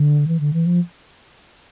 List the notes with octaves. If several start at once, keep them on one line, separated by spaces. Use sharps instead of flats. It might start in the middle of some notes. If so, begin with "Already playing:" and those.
Already playing: D3
E3
D3
E3
F3